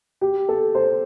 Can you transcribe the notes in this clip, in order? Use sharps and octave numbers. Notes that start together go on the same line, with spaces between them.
G4
A4
C5